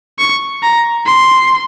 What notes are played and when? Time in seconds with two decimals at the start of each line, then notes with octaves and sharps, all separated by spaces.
0.19 C#6
0.62 A#5
1.06 C6